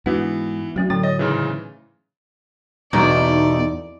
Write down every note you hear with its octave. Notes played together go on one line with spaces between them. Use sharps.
G#2 E3 B3 D4 F#4 F#5
F#3 A3 C#4 F#4
A2 D3 F#3 G5 A6
C#5 D#5
G#2 C#3 E3
E2 B2 A3 D#4 D5